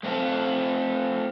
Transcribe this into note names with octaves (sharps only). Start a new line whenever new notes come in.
A3 C4 D#4 F4 A4